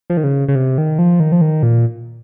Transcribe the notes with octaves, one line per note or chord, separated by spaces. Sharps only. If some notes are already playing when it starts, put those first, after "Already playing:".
F3
D#3
C#3
C#3
C3
D#3
F3
D#3
F3
D#3
A#2